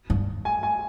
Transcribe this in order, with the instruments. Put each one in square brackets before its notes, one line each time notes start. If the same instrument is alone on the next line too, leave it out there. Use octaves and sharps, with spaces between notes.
[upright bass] G2
[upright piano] G#5
G#5